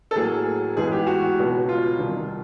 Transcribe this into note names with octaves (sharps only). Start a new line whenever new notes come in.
A4
A2 F#3 A#3 G#4
G#2 E3 G#3 B3 G#4
G4
F#4
C#2 B2 F#3
F4
C2 C3 D#3